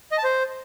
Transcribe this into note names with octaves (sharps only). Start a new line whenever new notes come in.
D#5
A5
C5